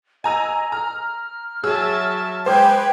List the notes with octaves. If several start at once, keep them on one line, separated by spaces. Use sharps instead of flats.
D#5 G#5 A#5 E6
A#5 F6
F#3 G#4 E5 A5 E6
G#3 B4 C5 G5 G#5 D6 G6